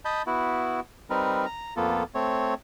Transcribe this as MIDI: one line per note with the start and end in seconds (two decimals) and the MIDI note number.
0.05 0.22 75
0.05 0.22 81
0.05 0.22 83
0.05 0.22 91
0.26 0.80 59
0.26 0.80 64
0.26 0.80 66
1.10 1.46 55
1.10 1.46 60
1.10 1.46 63
1.10 1.46 70
1.10 1.46 71
1.46 1.74 82
1.76 2.03 41
1.76 2.03 58
1.76 2.03 59
1.76 2.03 65
1.76 2.03 69
2.15 2.54 57
2.15 2.54 60
2.15 2.54 73